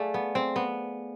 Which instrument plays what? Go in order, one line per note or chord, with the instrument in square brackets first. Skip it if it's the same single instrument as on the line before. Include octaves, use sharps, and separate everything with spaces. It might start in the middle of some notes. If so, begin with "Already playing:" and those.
Already playing: [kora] A3 [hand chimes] G#4 D5 F5 G#5
[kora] B3
C4
B3